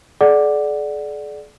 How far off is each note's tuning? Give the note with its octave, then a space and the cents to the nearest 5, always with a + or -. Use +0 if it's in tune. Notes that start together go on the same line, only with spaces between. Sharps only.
G#4 +45 D5 +0 F#5 +0